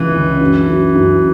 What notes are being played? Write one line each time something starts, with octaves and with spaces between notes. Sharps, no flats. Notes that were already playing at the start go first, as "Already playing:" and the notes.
Already playing: C#2 E3 F#3
C#3
F#2
F#2
F#2